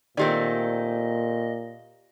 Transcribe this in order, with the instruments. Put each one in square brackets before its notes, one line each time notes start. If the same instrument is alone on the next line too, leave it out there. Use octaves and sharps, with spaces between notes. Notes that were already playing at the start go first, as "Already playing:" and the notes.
[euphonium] A#2 [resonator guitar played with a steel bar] D#3 A3 C4 [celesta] G4 D5 [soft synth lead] D#5